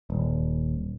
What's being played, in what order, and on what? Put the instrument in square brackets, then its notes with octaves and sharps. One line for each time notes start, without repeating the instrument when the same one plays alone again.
[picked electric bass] D#1